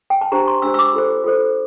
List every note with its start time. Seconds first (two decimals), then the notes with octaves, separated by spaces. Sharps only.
0.10 G5
0.21 A5
0.32 D4 G4 C5 A#5
0.48 C6
0.62 D4 G4 C5 E6
0.74 E6
0.79 D6
0.93 F4 A4 C5
1.24 F4 A4 C5